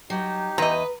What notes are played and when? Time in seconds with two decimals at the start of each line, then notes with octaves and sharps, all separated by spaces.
0.10 F#3 D#4 G4
0.58 E2 B4 D#5 A#5